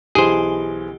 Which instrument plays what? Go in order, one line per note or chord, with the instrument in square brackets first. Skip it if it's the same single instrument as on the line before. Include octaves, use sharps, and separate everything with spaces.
[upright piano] B1 E3 [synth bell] G4 [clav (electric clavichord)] G#4 C5